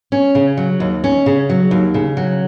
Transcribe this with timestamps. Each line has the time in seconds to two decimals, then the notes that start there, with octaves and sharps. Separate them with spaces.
0.12 C#4
0.35 C#3
0.57 F#3
0.80 D#2
1.04 C#4
1.26 C#3
1.50 F#3
1.71 D#2
1.94 C#3
2.17 F#3